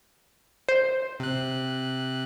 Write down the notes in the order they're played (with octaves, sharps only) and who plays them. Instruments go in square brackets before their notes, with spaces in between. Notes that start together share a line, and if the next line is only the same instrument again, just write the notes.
[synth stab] C5
[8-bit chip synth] C3 F#6